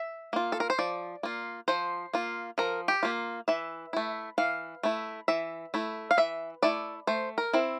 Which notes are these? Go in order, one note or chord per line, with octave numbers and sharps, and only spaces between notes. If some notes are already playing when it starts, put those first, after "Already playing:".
Already playing: E5
A#3 F4
A4
A#4
C5
F3 D5
A#3 F4
F3 C5
A#3 F4
F3 A#4
G4
A#3 F4
E3 E5
A3 E4
E3 F5
A3 E4
E3 E5
A3 E4
F5
E3 E5
A3 E4 D5
A3 C5
A#4
C4 E4